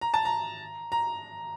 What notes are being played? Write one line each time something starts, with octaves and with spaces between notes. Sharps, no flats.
A#5
A5
A#5
A#5